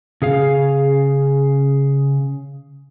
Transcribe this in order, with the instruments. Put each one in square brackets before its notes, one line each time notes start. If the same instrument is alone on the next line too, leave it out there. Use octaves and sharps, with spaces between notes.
[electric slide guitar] C#3 G#4 F5